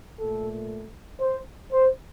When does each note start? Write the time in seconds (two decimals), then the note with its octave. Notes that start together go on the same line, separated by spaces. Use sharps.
0.18 A#2 A3 A4
1.21 C5
1.72 C5